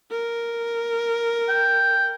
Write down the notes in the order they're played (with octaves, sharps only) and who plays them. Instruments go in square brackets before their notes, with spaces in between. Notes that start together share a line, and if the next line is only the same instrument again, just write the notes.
[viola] A#4
[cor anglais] G5